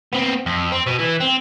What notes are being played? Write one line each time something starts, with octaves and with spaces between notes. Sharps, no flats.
B3 C4
F2
C4
B2
E3
C4